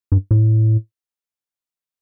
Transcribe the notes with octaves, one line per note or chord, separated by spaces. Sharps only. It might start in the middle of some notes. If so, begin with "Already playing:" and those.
G2
A2